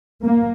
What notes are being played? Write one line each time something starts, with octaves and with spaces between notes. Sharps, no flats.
A#3